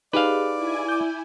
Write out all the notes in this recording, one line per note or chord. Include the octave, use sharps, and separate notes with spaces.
D#4 G4 G#4 B4 D5 F5
E4 G#5
D6 G6